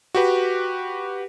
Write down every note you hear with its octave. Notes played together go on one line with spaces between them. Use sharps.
F#4 G4 B4